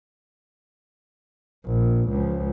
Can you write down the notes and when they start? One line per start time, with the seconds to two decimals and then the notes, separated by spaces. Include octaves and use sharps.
1.65 A#1
2.10 C#2 F3